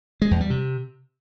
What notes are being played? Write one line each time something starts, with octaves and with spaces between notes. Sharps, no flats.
G#3
E2
G3
C3